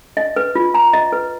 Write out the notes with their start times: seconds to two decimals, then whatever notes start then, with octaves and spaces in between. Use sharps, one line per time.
0.17 D#5
0.36 B4
0.55 F4
0.74 A#5
0.93 D#5
1.12 B4